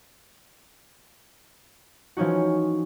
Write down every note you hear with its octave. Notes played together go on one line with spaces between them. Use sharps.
E3 F3 C#4 D#4 F#4